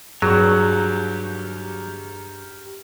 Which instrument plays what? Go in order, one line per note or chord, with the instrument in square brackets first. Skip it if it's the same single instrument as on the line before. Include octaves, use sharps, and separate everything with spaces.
[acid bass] G2 [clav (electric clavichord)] F#3 [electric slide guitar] G4 A#4 [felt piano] G#4 C#6